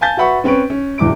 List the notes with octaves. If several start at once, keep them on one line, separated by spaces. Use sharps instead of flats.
F5 G#5 A5 G6 A6
F#4 B4 E5 F#5 B5 C#6
C4 C#4 B4 C#6 D7
C#4
D1 E2 D6 D7